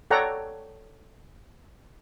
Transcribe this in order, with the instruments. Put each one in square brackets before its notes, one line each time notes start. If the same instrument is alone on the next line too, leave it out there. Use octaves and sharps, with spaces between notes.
[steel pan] A4 C#5 D5 F#5 G5 A#5